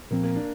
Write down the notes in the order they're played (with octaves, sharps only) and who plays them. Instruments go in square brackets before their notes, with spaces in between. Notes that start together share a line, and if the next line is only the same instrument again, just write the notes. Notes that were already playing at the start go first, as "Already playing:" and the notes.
[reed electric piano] A#2 F3 C4 [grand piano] A#3
[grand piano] A#3
D4